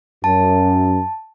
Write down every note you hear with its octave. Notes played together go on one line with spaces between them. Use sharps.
F#2 A5